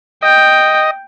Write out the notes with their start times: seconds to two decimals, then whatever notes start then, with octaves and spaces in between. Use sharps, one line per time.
0.22 D#5 G5